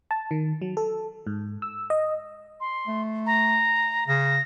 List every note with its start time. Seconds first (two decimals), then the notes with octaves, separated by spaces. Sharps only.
0.11 A5
0.31 D#3
0.62 F#3
0.77 A4
1.27 G#2
1.62 E6
1.90 D#5
2.60 C6
2.87 A3
3.26 A#5
4.08 C#3 A#6